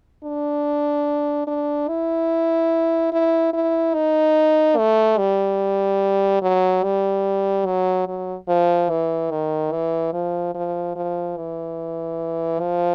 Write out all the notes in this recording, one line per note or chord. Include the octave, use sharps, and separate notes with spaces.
D4
D4
E4
E4
E4
D#4
A3
G3
F#3
G3
F#3
F#3
F3
E3
D#3
E3
F3
F3
F3
E3
F3